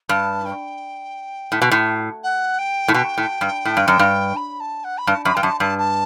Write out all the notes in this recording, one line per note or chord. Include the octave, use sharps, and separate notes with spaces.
G2 A5
G5
A2
B2
A2
F#5
G5
A2
B2 G5
A2
G2
A2
G2
F#2
G2
B5
A5
F#5
B5
G2 A5
F#2 B5
G2 G5
F#2 A5
G2 A5
A5